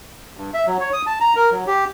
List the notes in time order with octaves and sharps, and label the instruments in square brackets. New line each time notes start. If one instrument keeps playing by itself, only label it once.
[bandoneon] G2
E5
F#3
C#5
D#6
A5
A#5
A#4
F#3
G4